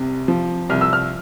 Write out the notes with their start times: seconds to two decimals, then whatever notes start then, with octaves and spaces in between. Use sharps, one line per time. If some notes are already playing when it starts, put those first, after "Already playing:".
Already playing: C2 C3
0.28 F3
0.70 C2 F6
0.81 E6
0.93 F6